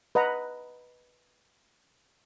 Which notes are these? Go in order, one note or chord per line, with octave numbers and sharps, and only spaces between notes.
B4 D#5 F#5 A#5